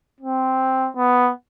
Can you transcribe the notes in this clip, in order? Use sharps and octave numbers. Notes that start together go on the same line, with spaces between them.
C4
B3